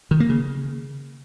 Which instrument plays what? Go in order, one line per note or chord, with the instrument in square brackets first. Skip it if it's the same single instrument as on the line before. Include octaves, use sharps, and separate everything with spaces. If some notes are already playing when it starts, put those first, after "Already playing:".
[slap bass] D#3
A#3
C#3